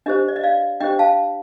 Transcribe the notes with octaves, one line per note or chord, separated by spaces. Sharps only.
D4 G4 C5 D#5
D5
D#5
D5 F5
D4 G4 C5 D#5 G5
F5 A5